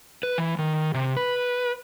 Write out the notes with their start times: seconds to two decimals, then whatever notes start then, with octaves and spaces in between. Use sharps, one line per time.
0.23 B4
0.38 E3
0.59 D#3
0.94 C3
1.17 B4